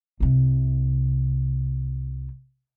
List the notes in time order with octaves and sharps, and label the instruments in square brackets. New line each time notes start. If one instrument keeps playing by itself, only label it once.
[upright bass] C2 C3